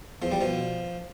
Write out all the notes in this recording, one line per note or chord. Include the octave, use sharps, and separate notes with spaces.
E2 F3
G3
B2 F3